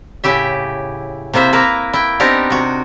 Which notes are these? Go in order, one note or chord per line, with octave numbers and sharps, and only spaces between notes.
A2 C#3 E4 G4 E5
C3 A#3 E4 C5 E5
A#3 E4 A#4 B4
E4 G5
B3 C4 D4 D#4 G4 A#4
C3 F#4